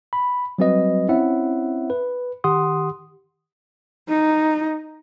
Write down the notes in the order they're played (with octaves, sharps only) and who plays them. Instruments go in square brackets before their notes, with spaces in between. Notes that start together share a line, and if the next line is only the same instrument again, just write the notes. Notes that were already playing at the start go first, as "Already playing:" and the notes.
[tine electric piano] B5
F#3 G3 C4 F#4 B4 D#5
C4 C#4 E4 C#5 E5 F#5
B4
D#3 G4 F#5 C6 D#6
[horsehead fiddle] D#4